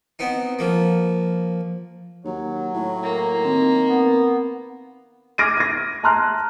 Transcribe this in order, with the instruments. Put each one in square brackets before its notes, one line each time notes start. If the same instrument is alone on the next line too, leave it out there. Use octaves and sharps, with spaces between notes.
[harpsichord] B3 C4 D#4
F3 A#3
[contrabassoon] D#2 [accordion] F#3
[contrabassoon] A2
[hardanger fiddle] A#3
[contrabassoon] D#3 [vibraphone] C4 A#4
[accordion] B3
[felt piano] D6 F6 G#6 A#6 D7 D#7
G#6 A#6
A5 A#5 C6 F6 F#6